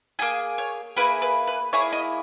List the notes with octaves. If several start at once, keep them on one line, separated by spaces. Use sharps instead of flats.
A#3 E4 G#4 G#5
C#5
A#3 E4 G#4 B4
B4
B4
A#3 E4 G#4 C#5
D#5